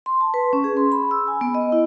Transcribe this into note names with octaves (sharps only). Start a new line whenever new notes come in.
C6
A5
B4
C#4
G#4
C6
B5
E6
G#5
B3
D#5
E4